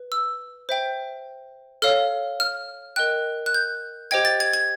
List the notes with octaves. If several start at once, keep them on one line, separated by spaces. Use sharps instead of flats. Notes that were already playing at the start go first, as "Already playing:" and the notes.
Already playing: B4
E6
C5 E5 G5
A4 C#5 F5 F6
F6
A#4 D#5 G5 F#6
F#6
G6
G4 C5 D#5 G5 G#6
A6
G#6
G#6